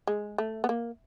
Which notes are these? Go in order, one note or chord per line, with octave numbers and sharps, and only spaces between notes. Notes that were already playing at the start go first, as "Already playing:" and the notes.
G#3
A3
B3
A#3